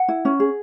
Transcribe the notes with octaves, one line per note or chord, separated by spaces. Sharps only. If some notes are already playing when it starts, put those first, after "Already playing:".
Already playing: F#5
E4
C#4
G#4